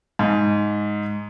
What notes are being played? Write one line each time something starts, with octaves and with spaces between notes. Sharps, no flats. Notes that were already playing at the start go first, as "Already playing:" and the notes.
G#2